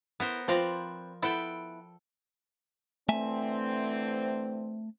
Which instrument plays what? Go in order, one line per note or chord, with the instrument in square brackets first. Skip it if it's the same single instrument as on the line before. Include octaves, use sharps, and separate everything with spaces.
[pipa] E3 [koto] B3 A#4 C5
[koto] F3 D5 A#5 [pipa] C4 F4 B4
[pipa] B3 E4 B4 [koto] A4 G5
[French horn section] D3 E3 C4 [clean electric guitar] A3 E5 G#5